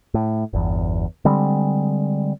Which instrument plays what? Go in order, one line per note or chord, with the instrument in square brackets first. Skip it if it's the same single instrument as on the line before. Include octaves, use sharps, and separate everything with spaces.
[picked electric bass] A2
G1 E2
D3 G3 G#3 C4